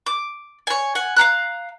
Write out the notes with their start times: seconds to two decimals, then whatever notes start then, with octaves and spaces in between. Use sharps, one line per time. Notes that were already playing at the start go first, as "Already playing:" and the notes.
0.06 D6
0.67 C#5 G#5
0.95 F#5 G#5
1.16 F5 F#5 A#5 F#6